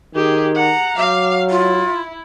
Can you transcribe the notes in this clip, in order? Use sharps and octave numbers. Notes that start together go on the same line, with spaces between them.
D#3 G4 G#4
F#5 A#5
F#3 F5 D6
E4 F4